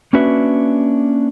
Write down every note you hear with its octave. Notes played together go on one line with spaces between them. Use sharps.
A#3 C#4 D4 F#4 B4 E5